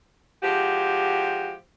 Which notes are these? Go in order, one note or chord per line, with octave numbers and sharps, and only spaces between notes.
F3 G#3 F#4 G4